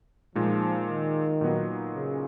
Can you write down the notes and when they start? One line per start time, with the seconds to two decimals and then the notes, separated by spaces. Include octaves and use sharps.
0.35 A#2 F3 G#3 D#4
0.88 D#3
1.41 A#2 F#3 B3 D#4
1.94 C#3